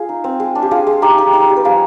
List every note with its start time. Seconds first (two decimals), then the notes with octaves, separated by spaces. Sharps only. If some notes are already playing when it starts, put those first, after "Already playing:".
Already playing: F4 G#4
0.09 D#4
0.24 C4
0.40 G#3
0.55 D4
0.62 G4
0.71 G#3 F4
0.87 G#3
1.02 D#4 G4
1.18 D#4
1.33 D#4
1.49 G3
1.57 B4
1.65 F3 F4 G#4